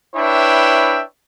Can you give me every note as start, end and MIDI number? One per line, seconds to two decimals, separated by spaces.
0.15 1.01 62
0.15 1.01 64
0.15 1.01 71
0.15 1.01 73
0.15 1.01 76
0.15 1.01 79